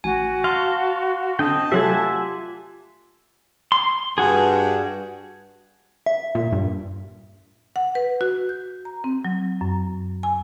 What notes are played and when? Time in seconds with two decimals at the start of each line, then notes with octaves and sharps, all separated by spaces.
0.04 A1 F#4 G#5
0.44 F5 A5 C6
1.39 D3 C4 D#5 G5 A5
1.72 C3 F#3 A3 F4 G4 E5 F#5 G#5
3.72 C6
4.18 G2 F#4 G#4
6.06 E5
6.35 A#2
6.52 G2
7.76 F#5
7.95 B4
8.21 F#4
8.49 G6
8.85 A#5
9.04 C4
9.25 F#3
9.61 F#2
10.23 G#5